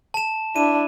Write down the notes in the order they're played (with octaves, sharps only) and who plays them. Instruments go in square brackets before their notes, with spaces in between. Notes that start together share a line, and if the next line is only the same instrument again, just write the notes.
[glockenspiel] A5 E7
[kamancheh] D4 E4 [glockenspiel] D#7